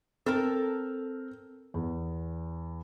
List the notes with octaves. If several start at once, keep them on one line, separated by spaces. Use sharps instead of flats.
C4 A4 A#4 F6
E2